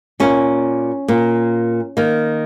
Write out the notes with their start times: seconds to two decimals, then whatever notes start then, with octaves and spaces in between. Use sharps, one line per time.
0.20 A#2 A#3 C#4
1.08 A#2 A#3
1.97 D#3 A#3